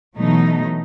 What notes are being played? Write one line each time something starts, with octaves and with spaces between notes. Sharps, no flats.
B2 E3 F#3 A3 D#4